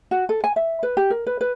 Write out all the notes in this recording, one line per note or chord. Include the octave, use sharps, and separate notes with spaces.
F#4
A4
G#5
E5
B4
G4
A#4
B4
B4